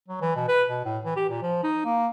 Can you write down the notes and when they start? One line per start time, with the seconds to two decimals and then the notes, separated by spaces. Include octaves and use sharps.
0.08 F#3
0.21 E3
0.36 B2
0.48 B4
0.69 B2
0.85 A2
1.05 E3
1.16 G4
1.30 A#2
1.42 F3
1.63 D#4
1.85 A#3